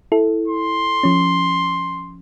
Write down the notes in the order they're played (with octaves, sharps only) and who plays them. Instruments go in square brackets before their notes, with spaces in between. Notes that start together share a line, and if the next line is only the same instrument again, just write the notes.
[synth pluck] E4 A4
[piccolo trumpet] C6
[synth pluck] F3 C#4